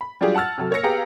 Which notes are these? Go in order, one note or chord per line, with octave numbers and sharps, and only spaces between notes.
B5
F#3 G3 D4 F4 G4 G#4
F#5 A5 E6 F6 A6
C3 F#3 A4
A#3 C#5 E6 A#6 C#7
B3 G4 G#4 F5 G5 A#5